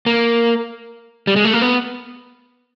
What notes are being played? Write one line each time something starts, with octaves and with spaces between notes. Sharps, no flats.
A#3
G3
G#3
A3
A#3
B3